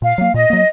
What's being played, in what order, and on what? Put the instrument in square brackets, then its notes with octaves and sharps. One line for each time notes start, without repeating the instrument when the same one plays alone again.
[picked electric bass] A#2 [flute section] F5
[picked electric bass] F#3 A#3
[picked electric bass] A#2 [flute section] D#5
[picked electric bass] F#3 A#3